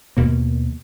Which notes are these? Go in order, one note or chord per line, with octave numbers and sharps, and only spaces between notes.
D#2 B2 A#3